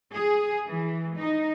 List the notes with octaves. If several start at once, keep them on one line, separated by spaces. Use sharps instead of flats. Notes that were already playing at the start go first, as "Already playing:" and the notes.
G#4
E3
D#4